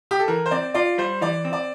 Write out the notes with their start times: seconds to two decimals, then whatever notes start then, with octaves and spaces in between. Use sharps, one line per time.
0.11 G4
0.19 A4
0.28 E3 A#4
0.46 C5
0.51 C4 D5
0.74 F4 D5
0.98 G3 C5
1.21 E3 D5
1.45 C4
1.53 D5